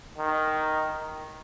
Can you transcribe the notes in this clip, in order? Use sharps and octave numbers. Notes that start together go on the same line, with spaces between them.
D#3